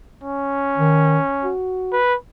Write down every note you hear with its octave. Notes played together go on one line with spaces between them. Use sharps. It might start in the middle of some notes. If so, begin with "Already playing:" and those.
C#4
D#3
F#4
B4